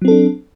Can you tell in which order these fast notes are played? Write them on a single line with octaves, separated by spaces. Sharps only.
F#3 C4 A4 D4